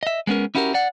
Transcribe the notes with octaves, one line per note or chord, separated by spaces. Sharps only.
D#5 E5
G#3 B3 C#4 A#4
C#4 E4 F#4 G4 A4 A#4
D5 F#5